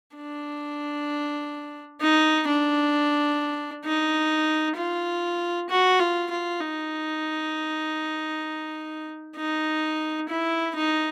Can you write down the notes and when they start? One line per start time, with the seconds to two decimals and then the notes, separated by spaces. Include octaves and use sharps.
0.16 D4
2.01 D#4
2.47 D4
3.85 D#4
4.77 F4
5.70 F#4
6.00 F4
6.31 F4
6.61 D#4
9.37 D#4
10.29 E4
10.76 D#4